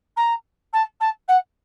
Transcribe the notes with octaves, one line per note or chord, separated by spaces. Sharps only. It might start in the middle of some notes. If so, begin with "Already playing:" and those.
A#5
A5
A5
F#5